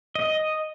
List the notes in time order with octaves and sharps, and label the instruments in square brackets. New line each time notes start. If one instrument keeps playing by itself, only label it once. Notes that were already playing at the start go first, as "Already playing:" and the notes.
[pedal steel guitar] D#5